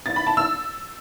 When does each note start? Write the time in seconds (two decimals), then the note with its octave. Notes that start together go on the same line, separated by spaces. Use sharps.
0.06 A6
0.16 B5
0.27 A5
0.37 E6